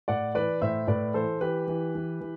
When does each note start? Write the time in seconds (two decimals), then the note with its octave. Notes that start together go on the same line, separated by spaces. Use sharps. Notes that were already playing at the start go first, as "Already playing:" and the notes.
0.08 A2 D5 F#5
0.35 E3 B4 D5
0.61 A2 C5 E5
0.88 A2 B4 D5
1.14 E3 A4 C5
1.41 E3 G4 B4
1.67 E3
1.95 E3
2.21 E3